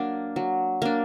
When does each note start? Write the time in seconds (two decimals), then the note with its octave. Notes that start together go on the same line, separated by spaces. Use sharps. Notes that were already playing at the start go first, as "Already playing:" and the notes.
Already playing: F#3 A#3 D4
0.36 F#3
0.82 A#3 D4